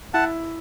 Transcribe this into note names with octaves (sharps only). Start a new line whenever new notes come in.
E4 F#5 A5